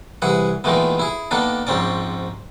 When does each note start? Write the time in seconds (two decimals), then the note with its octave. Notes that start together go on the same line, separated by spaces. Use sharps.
0.22 C2 E3 G#4 F#5
0.64 A#2 D#3 E3 G#3 A3 B3
0.99 E4 G#4
1.31 D#3 A#3 B3 D4 A4
1.67 A#1 G#2 C4 C#4 D5